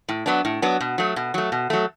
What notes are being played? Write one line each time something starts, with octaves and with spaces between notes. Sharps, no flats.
A2
F#3 B3 D4
A2
F#3 B3 D4
B2
F#3 A3
B2
F#3 A3
B2
F#3 A3